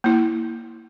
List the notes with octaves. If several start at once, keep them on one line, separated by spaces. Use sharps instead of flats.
A#3 E4